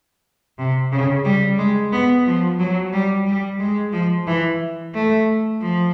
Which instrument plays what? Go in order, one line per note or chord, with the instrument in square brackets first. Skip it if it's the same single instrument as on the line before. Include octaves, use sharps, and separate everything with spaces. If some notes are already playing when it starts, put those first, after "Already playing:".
[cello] C3
C#3
G3
G#3
B3
F3
F#3
G3
G3
G#3
F3
E3
A3
F3